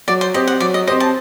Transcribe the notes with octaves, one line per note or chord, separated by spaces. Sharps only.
F#3 D5
C5
C4 G4 C5 D#5
F#5
F#3 D5
D#5
C4 G4 C5 D#5
A5